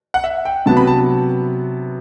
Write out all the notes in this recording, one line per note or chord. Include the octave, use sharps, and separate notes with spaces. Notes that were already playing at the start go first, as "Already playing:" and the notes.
F#5
E5
G5
C3 F#3 B3 A5
B5
A5